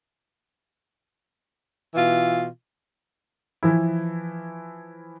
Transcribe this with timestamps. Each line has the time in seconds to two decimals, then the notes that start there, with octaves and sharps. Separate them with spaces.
1.94 B2 E3 F4
3.63 E3 F3 E4